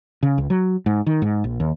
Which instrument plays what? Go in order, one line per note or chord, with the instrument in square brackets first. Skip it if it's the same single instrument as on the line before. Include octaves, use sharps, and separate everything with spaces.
[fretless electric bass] C#3
C#2
F#3
G#2
D#3
G#2
A#1
D#2